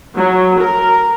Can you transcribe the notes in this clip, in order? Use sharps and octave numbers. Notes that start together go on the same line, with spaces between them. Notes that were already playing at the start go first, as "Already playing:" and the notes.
F#3
A#4